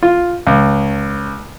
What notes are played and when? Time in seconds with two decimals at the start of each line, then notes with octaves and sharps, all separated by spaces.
0.03 F4
0.47 C#2